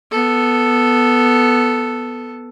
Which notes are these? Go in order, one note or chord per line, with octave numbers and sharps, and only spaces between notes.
B3 A4